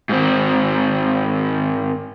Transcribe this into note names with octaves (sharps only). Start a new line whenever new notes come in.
G#2 C4